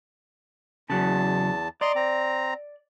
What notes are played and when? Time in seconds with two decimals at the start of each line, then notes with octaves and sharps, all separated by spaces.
0.90 E2 C#3 F#3 A5
1.81 D5 D#5 A#5 C6
1.96 C4 A#5